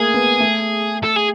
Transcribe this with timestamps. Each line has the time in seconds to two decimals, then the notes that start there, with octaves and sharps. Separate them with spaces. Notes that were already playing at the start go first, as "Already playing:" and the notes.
Already playing: A3 A#3 G#4
0.14 B3
0.40 A3
1.04 A4
1.17 G#4